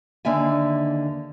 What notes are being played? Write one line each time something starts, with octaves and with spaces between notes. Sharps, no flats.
D#2 D3 A#3 E5 G#5